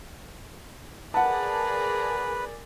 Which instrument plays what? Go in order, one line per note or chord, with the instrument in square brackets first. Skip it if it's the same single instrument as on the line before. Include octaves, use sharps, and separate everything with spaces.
[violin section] G#4 A#4 D5 [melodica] B4 [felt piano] F#5 A5